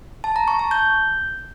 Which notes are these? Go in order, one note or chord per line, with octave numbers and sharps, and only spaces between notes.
A5
A#5
C#6
A5
G6